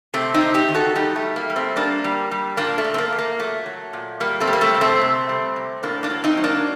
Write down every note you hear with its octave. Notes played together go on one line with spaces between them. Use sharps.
C3 A3 C4
C4 D#4
C3
D#4 G4
D#3
F#4 A4
G3 D#4 G4
A3
G3
A#3
G3
A3 C4
G3 A#3 D4
G3
G3
A#2 A#3 D4
A3
A#2
C4
A#3
A#2
A#3
F#3 A3
F#3
A#2
G3 A#3
A3 C4
G3
A#3
A3 C4
C3
A3 C4
C3
G3
C3
A2 A#3 D4
A#3 D4
F#3
C4 D#4
F#3
A#3 D4